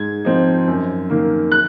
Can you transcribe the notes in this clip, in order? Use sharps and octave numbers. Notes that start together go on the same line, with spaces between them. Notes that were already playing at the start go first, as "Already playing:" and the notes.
Already playing: G#2 G#6
F3 C4 D#4
F#2
D#3 A#3
F#6